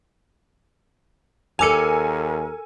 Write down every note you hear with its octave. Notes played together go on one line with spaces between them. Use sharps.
D#2 A4 A#4 G#5 D6 E6 C#7 F7